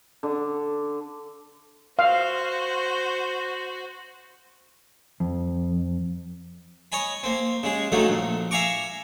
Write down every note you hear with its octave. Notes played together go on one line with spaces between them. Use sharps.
D3
F#4 C5 F5
F2
C#5 D#5 G#5 B5
A#3 C4
C#3 G#3 G#4
D3 D#3 F#3 A3 A#3
A#1
E5 F5 G#5 A#5 C#6 D6